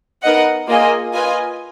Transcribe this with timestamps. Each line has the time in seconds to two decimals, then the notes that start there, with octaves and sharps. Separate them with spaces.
0.22 B3 D#4 A#4 D#5 F#5
0.68 A#3 F4 G#4 D#5 G#5
1.14 F4 B4 D#5 G#5